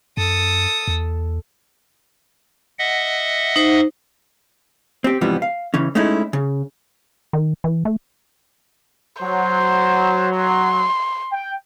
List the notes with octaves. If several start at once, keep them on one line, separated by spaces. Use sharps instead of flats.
F#2 A4 D#6
E2
D#5 E5 F#5
D#4 C5
C4 G4
G#2 C3 E3 F3 G3 B3
F5
C#3 E3 C#4
G#3 A3 C#4 D#4 E4
C#3
D#3
E3
A3
F#3 C5
C6
G5